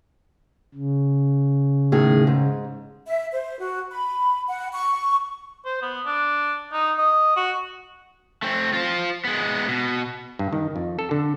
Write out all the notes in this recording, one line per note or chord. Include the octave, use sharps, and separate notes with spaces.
C#3
A2 D#3 G#4
G#2
E5
C5
F#4
B5
F#5
C#6
C5
B3
D4
D#4
D#5
F#4
A3 C4
F4 C5
G#3 B3
B2
G2
D#3
F2
A4
D3